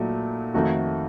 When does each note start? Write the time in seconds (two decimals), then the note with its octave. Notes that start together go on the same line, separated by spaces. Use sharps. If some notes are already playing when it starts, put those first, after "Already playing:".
Already playing: A#2 F#3 A3 D#4
0.54 F2 D#3 A3 D#4 F#4